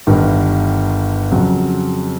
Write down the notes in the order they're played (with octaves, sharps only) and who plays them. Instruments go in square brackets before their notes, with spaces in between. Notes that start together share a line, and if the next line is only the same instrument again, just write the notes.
[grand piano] G1 G2 D#3
F2 C#3 F#3